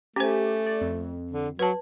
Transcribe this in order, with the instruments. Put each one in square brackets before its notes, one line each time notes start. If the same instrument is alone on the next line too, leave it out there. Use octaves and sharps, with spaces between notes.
[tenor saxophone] A3 [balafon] C#4 C5 [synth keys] G4 G#5
[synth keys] D5
F2
[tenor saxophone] D3
[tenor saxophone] F#3 [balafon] B4 A5